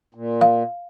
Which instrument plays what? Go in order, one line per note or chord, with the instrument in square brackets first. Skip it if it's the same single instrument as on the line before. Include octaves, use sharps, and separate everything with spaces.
[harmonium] A#2
[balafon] F5